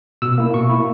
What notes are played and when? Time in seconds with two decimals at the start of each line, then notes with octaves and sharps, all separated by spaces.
0.22 B2 E6
0.38 A#3 E4
0.54 B2 C#6
0.70 A#3 E4